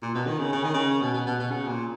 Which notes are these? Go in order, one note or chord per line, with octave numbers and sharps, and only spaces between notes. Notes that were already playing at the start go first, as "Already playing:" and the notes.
A#2
B2
D#3
C#3
C#3
D#3
C#3
B2
B2
B2
B2
C#3
A#2